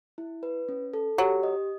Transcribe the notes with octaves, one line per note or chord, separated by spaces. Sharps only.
E4
B4
C#4
A4
F#3 G4
D#5